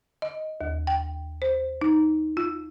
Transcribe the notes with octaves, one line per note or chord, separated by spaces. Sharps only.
D#5
D#2
G5
C5
D#4
F4